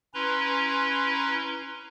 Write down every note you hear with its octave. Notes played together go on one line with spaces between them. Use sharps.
C#4 E4 B4 A#5 C6